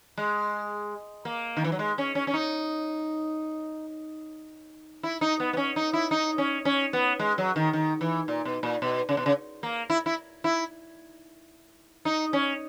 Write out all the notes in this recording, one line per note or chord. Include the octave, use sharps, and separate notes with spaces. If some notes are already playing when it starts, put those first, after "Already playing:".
G#3
A#3
D#3
E3
F#3
G#3
C#4
C#4
C#4
D#4
E4
D#4
B3
B3
C#4
D#4
E4
D#4
C#4
C#4
B3
G#3
F#3
D#3
D#3
E3
A#2
B2
A#2
B2
C#3
B2
C#3
A#3
E4
E4
E4
D#4
C#4